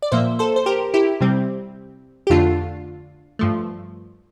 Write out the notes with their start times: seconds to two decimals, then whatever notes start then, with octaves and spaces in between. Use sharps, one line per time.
0.02 D5
0.12 A#2 F3 A#3 C5 E5
0.39 A4 C5
0.56 C5
0.66 G4 A#4
0.94 E4 G4
1.21 C3 G3 C4
2.27 G4
2.30 F2 D3 A3 D4 F4
3.39 G2 F3 A3